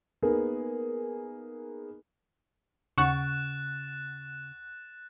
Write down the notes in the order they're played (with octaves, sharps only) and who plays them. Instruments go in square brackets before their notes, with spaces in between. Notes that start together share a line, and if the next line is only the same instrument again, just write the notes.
[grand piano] A#3 B3 D#4 G#4 A#4
[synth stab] D#2 F#5 C#6 [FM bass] C#3 [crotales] F#6 A6 E7